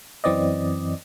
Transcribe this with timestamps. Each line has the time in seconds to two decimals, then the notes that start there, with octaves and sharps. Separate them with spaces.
0.24 F#2 E3 C4 D5 D#5